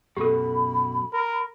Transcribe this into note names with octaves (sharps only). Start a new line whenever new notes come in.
F#2 B2 G4 A4 B5
A#4